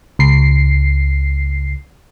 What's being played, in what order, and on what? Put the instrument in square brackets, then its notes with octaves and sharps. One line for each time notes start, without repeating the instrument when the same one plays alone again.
[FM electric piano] C#2 C7